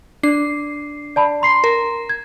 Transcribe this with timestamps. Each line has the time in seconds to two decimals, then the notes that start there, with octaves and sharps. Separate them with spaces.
0.23 D4 C7
1.16 D5 A5 B5
1.42 A#5 C6 C7
1.64 A#4
2.09 G#6